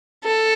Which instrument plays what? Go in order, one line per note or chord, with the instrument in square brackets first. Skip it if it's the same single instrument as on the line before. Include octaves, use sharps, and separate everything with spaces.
[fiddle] A4